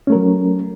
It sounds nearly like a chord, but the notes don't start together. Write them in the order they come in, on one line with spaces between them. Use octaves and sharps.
C#4 A3 A#4 F#3